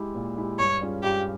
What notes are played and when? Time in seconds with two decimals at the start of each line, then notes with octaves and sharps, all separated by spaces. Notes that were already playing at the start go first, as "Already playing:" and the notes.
Already playing: G#3 E4 G4
0.15 A#2
0.36 G#3 E4 G4
0.59 G2 C#5
0.81 G3 C#4 F4 G#4
1.03 G2 G4